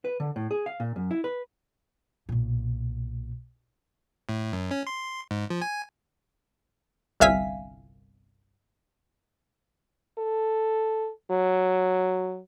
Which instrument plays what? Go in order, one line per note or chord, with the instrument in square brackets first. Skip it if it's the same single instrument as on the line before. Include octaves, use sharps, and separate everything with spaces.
[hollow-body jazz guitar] B4
D3
A2
G#4
F5
A#2
F#2
E4
B4
[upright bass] B1 A#2
[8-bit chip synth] A2
F#2
C#4
C6
G#2
F3
G#5
[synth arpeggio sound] G1 C2 E5 F5 G#5 B6
[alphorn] A4
F#3